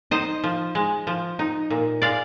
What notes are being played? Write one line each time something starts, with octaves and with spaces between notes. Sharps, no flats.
D#4 C5 D#5
F3
G#3
F3
D#4
A#2
G#3 D5 F5